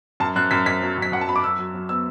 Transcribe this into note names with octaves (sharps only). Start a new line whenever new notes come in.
F#2 A5
F#2 F#6
F#2 B6
F#2 B6
F#3
F#2 B6
F#2 F#5
A5
F#3 B5
D6
F#2 E6
F#3
F#3
B3 E6